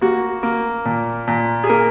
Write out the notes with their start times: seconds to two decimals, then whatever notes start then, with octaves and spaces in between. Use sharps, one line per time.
0.01 A#3 F#4
0.43 A#3
0.85 A#2
1.28 A#2
1.64 G#4
1.69 A#3 A#4